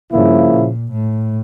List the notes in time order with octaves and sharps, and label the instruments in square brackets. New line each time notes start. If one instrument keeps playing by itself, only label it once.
[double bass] G2 [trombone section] C#3 F3 A#3 E4
[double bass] A#2
A2